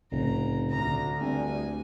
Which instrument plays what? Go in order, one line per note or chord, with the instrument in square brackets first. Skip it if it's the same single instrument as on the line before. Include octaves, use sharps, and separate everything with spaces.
[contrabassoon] F1 [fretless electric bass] C2 A2 C#3 [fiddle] A#5
[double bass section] D2 [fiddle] A#5
[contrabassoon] G2 [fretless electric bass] C4 [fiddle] G#5